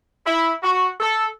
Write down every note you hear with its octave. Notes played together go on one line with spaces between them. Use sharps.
E4
F#4
A4